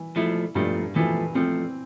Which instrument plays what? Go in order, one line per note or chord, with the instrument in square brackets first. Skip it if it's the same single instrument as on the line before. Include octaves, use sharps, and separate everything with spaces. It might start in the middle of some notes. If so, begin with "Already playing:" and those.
Already playing: [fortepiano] E3
[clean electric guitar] F3 A3 [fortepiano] E4
[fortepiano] G2 [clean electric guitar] F3 A3
[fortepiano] E3 [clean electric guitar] F3 A3
[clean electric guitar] F3 A3 [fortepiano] C4